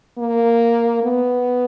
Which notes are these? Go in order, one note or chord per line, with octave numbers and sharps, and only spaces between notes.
A#3
B3